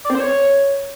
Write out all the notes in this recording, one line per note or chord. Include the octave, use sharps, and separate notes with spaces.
D5
C4
C5
C#5